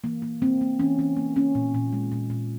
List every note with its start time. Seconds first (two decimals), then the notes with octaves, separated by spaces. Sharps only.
0.04 E3 A#3
0.22 A#3
0.42 A#3 C4
0.61 A#3
0.79 E3 C#4
0.99 E3 C#4
1.17 A#3
1.36 A#3 C#4
1.55 A#2
1.74 A#2
1.93 G#3
2.12 A#2
2.30 A#2